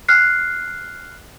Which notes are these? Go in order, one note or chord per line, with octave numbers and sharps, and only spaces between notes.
F6 F#6 C7